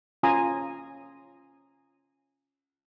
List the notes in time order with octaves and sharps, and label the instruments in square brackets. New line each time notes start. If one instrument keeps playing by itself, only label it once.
[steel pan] C#4 F4 G#5 A#5 C6 D#6